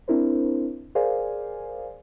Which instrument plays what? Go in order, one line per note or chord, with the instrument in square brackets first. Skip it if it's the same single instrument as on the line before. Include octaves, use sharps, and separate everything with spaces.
[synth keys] C4 D4 E4 A#4 C5
G#4 A#4 C5 D5 F5 G#5